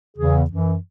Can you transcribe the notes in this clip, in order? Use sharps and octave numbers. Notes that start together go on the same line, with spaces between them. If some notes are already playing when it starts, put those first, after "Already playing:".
E2 C#3 E3 G#4
F#2 E3